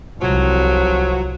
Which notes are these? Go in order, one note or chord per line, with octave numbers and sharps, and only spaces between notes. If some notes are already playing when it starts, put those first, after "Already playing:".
C2 F3 F#3